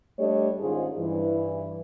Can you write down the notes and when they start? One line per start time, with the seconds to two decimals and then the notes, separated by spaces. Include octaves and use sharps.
0.19 G3 A3 D4 G4 C#5 D#5
0.60 G#2 D#3 C#4 F4 G#4 C5
0.99 G2 E3